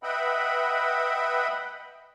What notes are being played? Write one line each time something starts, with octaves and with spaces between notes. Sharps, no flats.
B4 D#5 E5 F#5 G5 B5